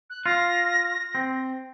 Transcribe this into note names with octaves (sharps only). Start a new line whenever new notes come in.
F#6
F4 A#6
C4